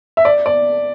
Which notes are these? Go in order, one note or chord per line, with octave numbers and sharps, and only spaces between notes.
E5
D5
D5